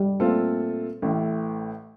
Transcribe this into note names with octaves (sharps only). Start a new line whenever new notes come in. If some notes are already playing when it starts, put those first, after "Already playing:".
Already playing: G3
A#2 A3 C4 F4 A4
A1 A2 A3